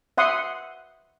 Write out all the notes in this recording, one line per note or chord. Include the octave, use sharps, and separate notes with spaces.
E5 F#5 C6 D#6